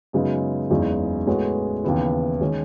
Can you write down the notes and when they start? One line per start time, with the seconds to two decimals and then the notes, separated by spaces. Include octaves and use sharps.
0.13 F#2 C#3 G#3 B3 D#4
0.70 F#1 E2 C#3 G#3 D#4
1.27 A2 G#3 B3 F#4 C#5
1.84 D#2 C#3 E3 B3 E4
2.41 D#3 G#3 C#4